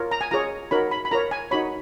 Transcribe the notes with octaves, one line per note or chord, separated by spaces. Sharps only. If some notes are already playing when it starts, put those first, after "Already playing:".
Already playing: F4 A#4 C#5
A#5
G#5
F4 G#4 C#5 A#5
D#4 F#4 A#4 C#5 B5
B5
B5
F4 A#4 C#5 A#5
G#5
D#4 F#4 C#5 B5